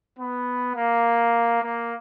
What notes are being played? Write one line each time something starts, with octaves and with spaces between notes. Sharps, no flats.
B3
A#3
A#3